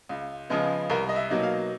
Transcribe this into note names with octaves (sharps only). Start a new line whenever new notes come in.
C#2
C#3 F3 G#3 B3
C2 A#4
D#5
E5
B2 F#3 A#3 D#4
F5